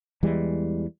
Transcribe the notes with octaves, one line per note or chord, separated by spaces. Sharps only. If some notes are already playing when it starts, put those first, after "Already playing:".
E2 E3 G3 G#3